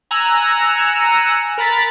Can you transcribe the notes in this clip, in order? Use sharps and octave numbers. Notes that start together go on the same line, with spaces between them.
G#5 A#5 E6 F#6 C#7
A#4 A#5 B5 A6 B6